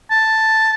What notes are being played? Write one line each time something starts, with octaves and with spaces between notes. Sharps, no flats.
A5